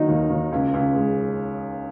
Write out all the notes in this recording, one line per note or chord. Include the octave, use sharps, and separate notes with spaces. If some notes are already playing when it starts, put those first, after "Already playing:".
Already playing: D#3 F#3 A#3 D#4
D#2
D#2
C#2
C#2
G#3